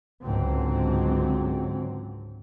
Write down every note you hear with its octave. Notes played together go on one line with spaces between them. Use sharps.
C#2 G#2 D3 F#3 C4